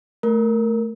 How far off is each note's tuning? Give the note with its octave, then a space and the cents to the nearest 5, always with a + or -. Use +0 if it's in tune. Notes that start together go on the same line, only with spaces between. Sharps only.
A3 +0 A#4 +0